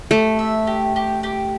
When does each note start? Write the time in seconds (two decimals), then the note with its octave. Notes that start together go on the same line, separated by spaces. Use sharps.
0.11 A3 G4
0.39 E5
0.67 G4
0.96 G4
1.23 G4